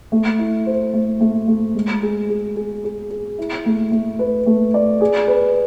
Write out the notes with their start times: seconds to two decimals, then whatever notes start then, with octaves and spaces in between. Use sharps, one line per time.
0.12 A3
0.38 E4
0.66 C5
0.93 A3
1.21 A3
1.48 A3
1.75 G#3
2.02 G#4
2.29 G#4
2.56 G#4
2.84 G#4
3.10 G#4
3.39 E4
3.66 A3
3.92 A3
4.19 B4
4.46 A3
4.74 D5
5.01 G#4
5.28 B4